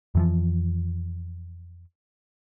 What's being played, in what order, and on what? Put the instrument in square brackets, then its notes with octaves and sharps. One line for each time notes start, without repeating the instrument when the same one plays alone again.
[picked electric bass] F2 E3 F3